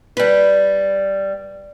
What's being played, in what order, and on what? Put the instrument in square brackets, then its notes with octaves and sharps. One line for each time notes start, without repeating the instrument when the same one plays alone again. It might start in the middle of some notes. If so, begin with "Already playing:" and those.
[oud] G3 B4